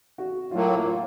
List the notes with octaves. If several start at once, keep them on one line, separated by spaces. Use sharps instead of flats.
F#4
A2 F#3 A#3 F4
F4